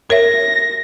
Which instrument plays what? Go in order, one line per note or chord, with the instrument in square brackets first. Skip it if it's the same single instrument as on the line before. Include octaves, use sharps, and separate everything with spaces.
[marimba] A#4 C#5 E5 [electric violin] A#6